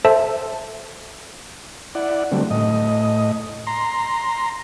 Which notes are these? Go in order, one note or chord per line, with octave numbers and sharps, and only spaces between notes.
A4 C5 E5 A5
E4 D5 F#5
D3 F#3 G3 A3 C4
A2 D#5
A#5 C6